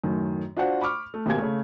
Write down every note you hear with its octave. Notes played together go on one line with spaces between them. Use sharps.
F#2 A2 D#3
D4 F4 F#4 C5 F#5
B5 C#6 D6 F6
A3
G#1 B2 A#3 G4 G#5 G#6
C#3 A3